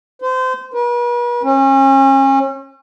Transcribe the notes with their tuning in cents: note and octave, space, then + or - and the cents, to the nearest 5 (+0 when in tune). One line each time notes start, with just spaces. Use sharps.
C5 -25
B4 -45
C#4 -35